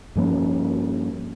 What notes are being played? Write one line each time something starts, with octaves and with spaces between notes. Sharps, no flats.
G2 F3 A#3 C#4